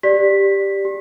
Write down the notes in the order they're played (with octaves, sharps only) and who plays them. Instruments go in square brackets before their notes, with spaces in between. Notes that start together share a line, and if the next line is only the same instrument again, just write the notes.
[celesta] G4 D5 B6
G4